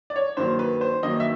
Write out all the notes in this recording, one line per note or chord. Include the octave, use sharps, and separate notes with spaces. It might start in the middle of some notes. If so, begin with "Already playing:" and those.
D5
C#5
G2 D#3 F#3 A#3 C5
B4
C5
G2 D#3 F#3 A#3 D#5
E5